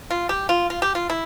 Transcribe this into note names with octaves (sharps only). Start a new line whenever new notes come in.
F4
G4
F4
F4
G4
F4
E4